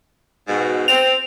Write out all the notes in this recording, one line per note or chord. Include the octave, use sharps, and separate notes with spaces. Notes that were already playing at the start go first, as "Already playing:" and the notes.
G#2 B2
C4 F7